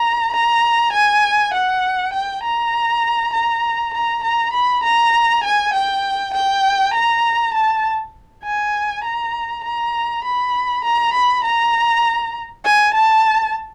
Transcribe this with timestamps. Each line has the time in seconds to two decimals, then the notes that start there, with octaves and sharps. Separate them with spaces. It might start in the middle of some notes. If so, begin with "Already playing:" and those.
Already playing: A#5
0.33 A#5
0.93 G#5
1.54 F#5
2.13 G5
2.43 A#5
3.33 A#5
3.94 A#5
4.24 A#5
4.54 B5
4.84 A#5
5.44 G#5
5.74 G5
6.34 G5
6.94 A#5
7.54 A5
8.44 G#5
9.04 A#5
9.64 A#5
10.24 B5
10.84 A#5
11.14 B5
11.44 A#5
12.64 G#5
12.94 A5